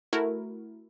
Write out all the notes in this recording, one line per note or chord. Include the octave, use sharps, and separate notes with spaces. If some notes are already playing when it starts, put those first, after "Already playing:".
A3 E4 F#4 A#4